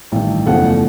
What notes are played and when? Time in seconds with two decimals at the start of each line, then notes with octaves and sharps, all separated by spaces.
0.12 A1 G2 D#3
0.46 F#1 E2 C#3 F3 A3 F#5